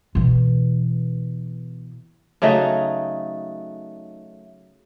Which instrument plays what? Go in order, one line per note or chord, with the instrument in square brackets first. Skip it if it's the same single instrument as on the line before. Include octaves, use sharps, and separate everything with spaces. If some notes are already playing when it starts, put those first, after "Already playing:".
[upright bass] B2 E3
[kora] C#3 F#3 A3 D#4